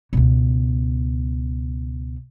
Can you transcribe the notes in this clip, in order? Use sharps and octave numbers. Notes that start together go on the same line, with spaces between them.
C#2 B2